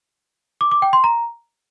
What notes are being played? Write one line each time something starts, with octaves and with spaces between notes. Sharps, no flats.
D6
D6
G5
C6
A#5